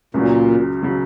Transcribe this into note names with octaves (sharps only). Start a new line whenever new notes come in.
C#2 A#2 C#3 F#3
C#3 F#3